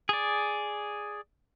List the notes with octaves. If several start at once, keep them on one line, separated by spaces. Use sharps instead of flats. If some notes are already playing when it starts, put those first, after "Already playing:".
G#4 D5